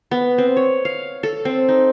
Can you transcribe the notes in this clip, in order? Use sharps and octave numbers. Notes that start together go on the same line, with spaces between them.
B3
C4
C#5
F5
A4
C4
D#4